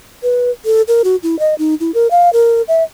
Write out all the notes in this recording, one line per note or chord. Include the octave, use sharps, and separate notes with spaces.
B4
A4
A#4
F#4
E4
D#5
D#4
E4
A#4
F5
A#4
E5